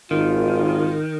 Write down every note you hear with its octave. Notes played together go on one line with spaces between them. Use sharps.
G#1 D#3 F4